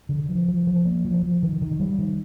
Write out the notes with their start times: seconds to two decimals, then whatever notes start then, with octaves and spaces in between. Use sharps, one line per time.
0.09 D3
0.29 F3
0.48 F3
0.67 F3
0.85 A#3
1.05 F3
1.23 F3
1.43 D#3
1.62 D#3
1.79 G3
1.99 D#3